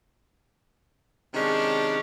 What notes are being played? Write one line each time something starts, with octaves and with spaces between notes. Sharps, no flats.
C3 D#3 G#3 C#4 D4